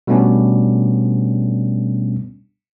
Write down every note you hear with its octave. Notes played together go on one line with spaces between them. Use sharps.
B2 G3 A3 B3 C#4 D4